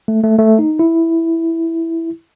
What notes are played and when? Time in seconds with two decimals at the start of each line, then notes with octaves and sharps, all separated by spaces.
0.08 A3
0.23 A3
0.39 A3
0.59 D#4
0.79 E4